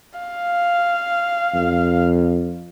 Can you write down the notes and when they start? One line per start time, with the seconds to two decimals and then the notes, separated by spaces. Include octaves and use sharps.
0.18 F5
1.54 F2